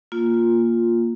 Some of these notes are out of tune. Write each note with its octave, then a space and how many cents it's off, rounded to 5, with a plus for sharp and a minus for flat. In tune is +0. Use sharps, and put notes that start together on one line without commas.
A#3 +0 F4 +0